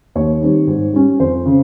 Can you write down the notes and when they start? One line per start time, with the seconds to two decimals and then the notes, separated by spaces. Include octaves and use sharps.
0.15 D#2 C#5
0.42 D#3 G3 C4
0.67 G#2
0.94 G3 C#4
1.20 F2 C5
1.46 C#3